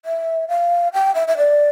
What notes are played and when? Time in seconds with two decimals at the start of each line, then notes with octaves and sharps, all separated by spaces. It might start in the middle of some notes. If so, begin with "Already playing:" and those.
0.05 E5
0.49 F5
0.93 G5
1.15 E5
1.28 E5
1.37 D5